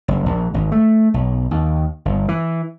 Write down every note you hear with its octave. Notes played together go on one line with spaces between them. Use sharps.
F#1
A#1
G#1
A3
B1
D#2
G1
E3